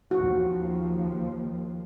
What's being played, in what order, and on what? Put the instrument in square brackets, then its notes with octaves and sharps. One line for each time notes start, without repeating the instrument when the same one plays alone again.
[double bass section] D#2 F3 [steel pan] F#4